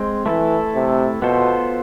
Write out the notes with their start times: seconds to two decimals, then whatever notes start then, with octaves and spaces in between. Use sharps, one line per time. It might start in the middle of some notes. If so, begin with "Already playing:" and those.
Already playing: G#3 C4
0.26 E3 A3 E4 A4
0.75 C3
1.22 B2 B3 F4 A4 C5